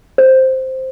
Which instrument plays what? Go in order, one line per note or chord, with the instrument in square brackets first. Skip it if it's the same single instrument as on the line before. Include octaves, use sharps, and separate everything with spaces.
[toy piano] C5